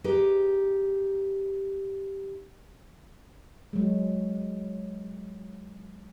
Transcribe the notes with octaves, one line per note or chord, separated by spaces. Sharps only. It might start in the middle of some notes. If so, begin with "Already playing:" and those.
D#4 G4 G#4 B4
F#3 G#3